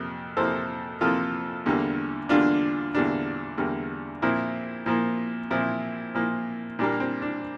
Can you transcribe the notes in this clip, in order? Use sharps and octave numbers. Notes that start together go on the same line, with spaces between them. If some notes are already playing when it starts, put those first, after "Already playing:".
Already playing: F2 C3 F3 A#3
F2 C3 F3 A#3 A4 C5
F2 C3 F3 A#3 F4 A4
E2 D3 G3 A#3
E2 D3 G3 A#3 D4 F4
E2 D3 G3 A#3 D4
E2 D3 G3 A#3
A#2 F3 A#3 C4 E4
A#2 F3 A#3
A#2 F3 A#3 C4 E4
A#2 F3 A#3
A#2 G3 A#3 D4
C4
D4